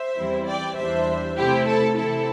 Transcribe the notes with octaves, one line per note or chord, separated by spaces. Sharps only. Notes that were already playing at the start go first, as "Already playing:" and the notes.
Already playing: C5 E5
E2 E3 G3 C4 E4
D5 G5
E2 E3 G3 D4 C5 E5
C3 A3 E4 G4 C5
A4
C3 E3 C4 E4 A4